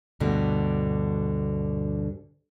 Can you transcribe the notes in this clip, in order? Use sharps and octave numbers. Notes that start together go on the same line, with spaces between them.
D2 G2 B2 D3